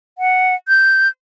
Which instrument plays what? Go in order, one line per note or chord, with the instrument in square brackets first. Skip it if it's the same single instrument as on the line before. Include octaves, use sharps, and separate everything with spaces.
[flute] F#5
G6